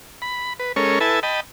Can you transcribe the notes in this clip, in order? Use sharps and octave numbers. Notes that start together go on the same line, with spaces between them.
B5
B4
G#3 C#4 A4 A#4 C#5
E4 A4 B4 G#5 A5
D#5 G5 A5 B5